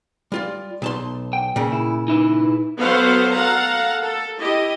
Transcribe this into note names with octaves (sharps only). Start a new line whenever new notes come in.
G3 F4 D5
B1 A5 C6
G5
A#2 C#3
E4
D#4 E4 B4
F#3 B3 A4 C5 F5 F#5
A4 F5 F#5 A#5
A4
E4 G4 D#5